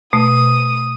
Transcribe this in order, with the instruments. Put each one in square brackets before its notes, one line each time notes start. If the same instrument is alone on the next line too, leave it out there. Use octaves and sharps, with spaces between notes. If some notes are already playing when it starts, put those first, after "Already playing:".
[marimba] B2 A3 [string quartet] D#6